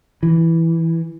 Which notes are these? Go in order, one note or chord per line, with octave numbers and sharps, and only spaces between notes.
E3